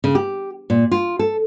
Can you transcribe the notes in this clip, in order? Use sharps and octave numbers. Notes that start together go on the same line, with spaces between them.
C#3
G4
A#2
F4
A4